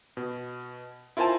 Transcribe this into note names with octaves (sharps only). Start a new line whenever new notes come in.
B2
E4 F4 A#4 C5 G#5 A5